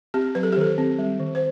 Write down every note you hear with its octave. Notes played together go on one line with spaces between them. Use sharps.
C4 G4
F#3 B4
A4
G4
D#3 A4
C4
G3
D#3
C5